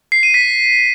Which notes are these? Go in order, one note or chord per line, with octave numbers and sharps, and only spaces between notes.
C7
D#7
B6